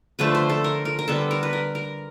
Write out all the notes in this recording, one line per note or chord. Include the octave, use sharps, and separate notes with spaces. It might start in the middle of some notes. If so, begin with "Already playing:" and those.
D3 F3 A3 B4
C5
A4
A#4
A#4
A#4
D3 G3 B3 A4
A#4
B4
A#4
A#4